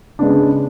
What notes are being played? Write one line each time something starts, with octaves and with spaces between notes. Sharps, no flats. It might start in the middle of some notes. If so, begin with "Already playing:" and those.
C#3 G#3 B3 D4